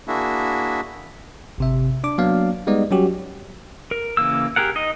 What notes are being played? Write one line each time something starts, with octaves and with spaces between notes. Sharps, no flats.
A#3 D4 E4 F#4 G#4 E5
G#1 C3 E5
D4 D6
F#3 A#3 B3 D4 D5 F5
G3 G#3 B3 D#4 D5 D#5
F#3 G3 C#4 F#4 G4
A#4
C#3 E3 A#3 E6
G4 G#4 A#4 F#5
D#4 D#5